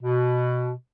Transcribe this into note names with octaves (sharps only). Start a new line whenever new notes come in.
B2